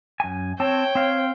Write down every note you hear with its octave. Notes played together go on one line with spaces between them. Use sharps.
F#2 G#5
C4 C#5 G5 A5
C4 F5